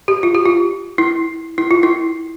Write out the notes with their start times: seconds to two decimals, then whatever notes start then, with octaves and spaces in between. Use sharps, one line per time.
0.08 G4
0.23 F4
0.35 G4
0.45 F4
0.98 E4
1.58 E4
1.71 F4
1.83 E4